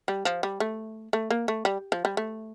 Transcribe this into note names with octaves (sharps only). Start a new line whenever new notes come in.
G3
F3
G3
A3
A3
A#3
A3
G3
F3
G3
A3